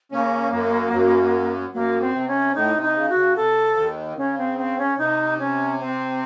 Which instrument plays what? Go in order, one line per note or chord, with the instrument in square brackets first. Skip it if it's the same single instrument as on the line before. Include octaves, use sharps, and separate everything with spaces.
[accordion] C#3 C#4 [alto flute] A#3
[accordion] F#2 F#3
F#2 F#3
[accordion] F#2 F#3 [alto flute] A#3
[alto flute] C4
[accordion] C3
[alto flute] C#4
[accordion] A2 [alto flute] D#4
[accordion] C3
[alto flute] D#4
[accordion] C#3
[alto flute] F#4
[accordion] C#3
[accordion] C3 [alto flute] A4
[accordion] F3
D#2 D#3
[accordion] C#3 [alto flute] C#4
[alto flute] C4
C4
C#4
[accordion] C3 [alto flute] D#4
[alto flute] C#4
C4